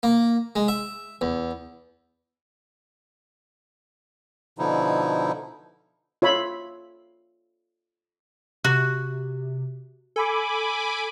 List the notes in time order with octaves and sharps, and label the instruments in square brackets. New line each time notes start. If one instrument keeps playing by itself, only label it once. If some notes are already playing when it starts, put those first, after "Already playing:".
[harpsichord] A#3
G#3
E5
E2
[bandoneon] B2 D3 F3 D#4 E4
[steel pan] F4 C#5 E5 B5
[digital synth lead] C3 [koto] F#4
[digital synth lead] A4 [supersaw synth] G#5 B5 D6